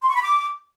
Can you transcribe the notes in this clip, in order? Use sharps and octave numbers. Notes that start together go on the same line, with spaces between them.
C6
C#6
B5
D6